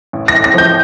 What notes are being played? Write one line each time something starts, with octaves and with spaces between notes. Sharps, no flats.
A1
A#6
A1
A#6
F3 G6